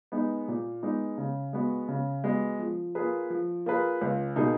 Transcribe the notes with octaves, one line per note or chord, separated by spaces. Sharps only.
G#3 B3 D#4
A#2
G#3 B3 D#4
C#3
G#3 B3 F#4
C#3
G#3 B3 F#4
F3
A#3 F4 G#4 B4
F3
A#3 F4 G#4 B4
C#2
B2 A#3 D#4 G#4